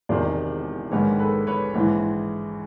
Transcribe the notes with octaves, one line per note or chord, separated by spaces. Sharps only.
E1 E2 C3 D#3 C5 D5
A#1 G#2 D#3 B4 C#5
A4 B4
B4 C#5
A#1 G#2 E3